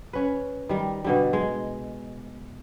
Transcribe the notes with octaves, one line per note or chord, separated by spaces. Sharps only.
C#4 B4
D#3 G3
B2 D3 G3
G#3